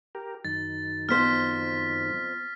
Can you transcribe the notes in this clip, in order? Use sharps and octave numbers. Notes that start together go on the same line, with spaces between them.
G4 A#4
F#2 D#3 A6
F2 B3 C5 F6 B6